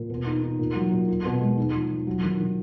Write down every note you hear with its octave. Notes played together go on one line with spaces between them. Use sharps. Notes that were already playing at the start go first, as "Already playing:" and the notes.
Already playing: A#2
B2
D#4
D#4
A#2
F#3
A#2
F4
B2
G#3
D#4
F3
F3
F#3
D#3
D#3